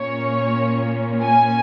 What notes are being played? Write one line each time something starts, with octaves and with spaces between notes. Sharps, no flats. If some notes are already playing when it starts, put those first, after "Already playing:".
Already playing: A#2 A#3 C#4 C#5
G#5